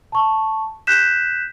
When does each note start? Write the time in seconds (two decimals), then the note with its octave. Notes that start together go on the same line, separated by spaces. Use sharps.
0.12 A5 C#6
0.87 F#6 G6 B6 E7